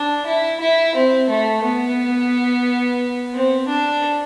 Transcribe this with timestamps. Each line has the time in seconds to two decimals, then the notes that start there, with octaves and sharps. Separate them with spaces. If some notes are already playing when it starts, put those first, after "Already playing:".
Already playing: D4
0.26 E4
0.60 E4
0.95 C4
1.29 A3
1.63 B3
3.34 C4
3.68 D4